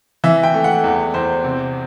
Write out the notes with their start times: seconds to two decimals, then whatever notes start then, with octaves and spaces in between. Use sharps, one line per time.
0.24 E3 E5
0.43 G5
0.54 A3
0.64 F#5
0.84 E2
1.14 E2 C5
1.44 C3